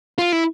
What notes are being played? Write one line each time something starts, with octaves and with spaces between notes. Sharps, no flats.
F4
E4